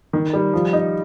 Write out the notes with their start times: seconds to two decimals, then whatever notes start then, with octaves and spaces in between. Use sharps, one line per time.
0.13 D#3
0.33 G3
0.53 F3
0.73 D#4